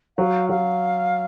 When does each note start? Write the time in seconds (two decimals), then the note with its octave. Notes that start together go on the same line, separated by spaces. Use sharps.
0.18 F#3 F5
0.49 F#3 F5